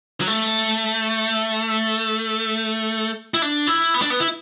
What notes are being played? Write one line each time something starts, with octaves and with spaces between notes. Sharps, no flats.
F#3
A3
E4
D4
E4
B3
D4
B3
E4